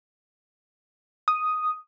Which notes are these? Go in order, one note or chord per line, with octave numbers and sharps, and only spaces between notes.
D#6